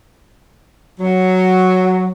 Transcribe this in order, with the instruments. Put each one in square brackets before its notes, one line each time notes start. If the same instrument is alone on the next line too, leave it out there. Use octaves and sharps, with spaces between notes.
[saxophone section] F#3